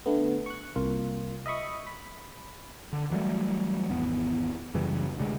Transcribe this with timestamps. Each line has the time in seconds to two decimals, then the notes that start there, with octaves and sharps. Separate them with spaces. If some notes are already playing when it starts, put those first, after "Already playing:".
0.06 D3 A3 B3
0.46 C#6 F#6
0.76 C2 A#3 F4
1.46 D#5 E5 B5 C#6 D#6
1.87 B5
2.93 D3
3.11 E3 F#3 G3 A3
3.90 G#1 E2 B3
4.74 F#2 C#3 E3 G3
5.18 D2 C3 G3 G#3